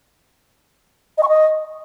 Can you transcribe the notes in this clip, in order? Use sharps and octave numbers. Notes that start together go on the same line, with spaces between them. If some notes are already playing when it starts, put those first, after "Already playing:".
D#5
C#6
D#5